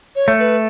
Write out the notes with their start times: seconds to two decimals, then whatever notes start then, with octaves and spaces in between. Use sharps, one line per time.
0.16 C#5
0.28 A3
0.40 B4